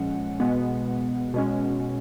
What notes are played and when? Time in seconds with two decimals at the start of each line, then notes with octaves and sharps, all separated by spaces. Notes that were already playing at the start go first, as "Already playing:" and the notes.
Already playing: A#2 F3 G#3 C#4 F#5
0.40 B2 G#3 B3
1.34 B2 G#3 C#4